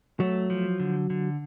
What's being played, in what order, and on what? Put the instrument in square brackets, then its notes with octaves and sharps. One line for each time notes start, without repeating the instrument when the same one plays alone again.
[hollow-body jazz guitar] F#3 [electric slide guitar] A3
[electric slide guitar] F3
D3
D3